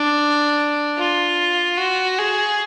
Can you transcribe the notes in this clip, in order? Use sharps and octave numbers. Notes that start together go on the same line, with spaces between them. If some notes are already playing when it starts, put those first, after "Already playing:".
Already playing: D4
F4
F#4
G#4